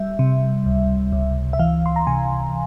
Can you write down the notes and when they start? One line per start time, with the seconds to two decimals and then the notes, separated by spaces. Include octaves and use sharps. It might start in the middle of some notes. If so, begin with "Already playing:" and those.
Already playing: G3 E5
0.19 C3
0.66 C#2
1.12 C#2
1.53 E5
1.59 E3 F5
1.86 C6
1.96 A#5
2.07 C3 G#5